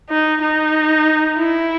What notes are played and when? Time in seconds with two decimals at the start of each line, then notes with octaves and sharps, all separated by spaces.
0.10 D#4
0.42 D#4
1.37 E4